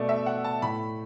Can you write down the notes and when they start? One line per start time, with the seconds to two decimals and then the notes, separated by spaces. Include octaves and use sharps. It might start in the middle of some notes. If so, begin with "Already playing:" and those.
Already playing: B2 A3 D5
0.09 E5
0.26 F#5
0.44 A5
0.62 A2 A3 B5